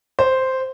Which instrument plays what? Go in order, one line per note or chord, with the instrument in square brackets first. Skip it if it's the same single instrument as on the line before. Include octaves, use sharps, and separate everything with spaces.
[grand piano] C5